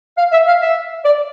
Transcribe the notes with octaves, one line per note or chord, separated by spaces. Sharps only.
F5
E5
F5
E5
D5